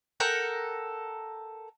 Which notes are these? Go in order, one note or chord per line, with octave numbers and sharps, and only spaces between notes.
A4 A#4 F#5 G5